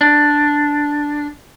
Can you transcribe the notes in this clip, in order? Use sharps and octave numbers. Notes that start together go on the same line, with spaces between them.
D4